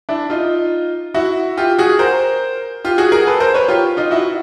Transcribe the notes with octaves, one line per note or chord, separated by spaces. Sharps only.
D4 E4
D#4 F4
E4 F#4
F4 G4
F#4 G#4
A#4 C5
F4 G4
F#4 G#4
G#4 A#4
A4 B4
A#4 C5
B4 C#5
F4 G4
D#4 F4
E4 F#4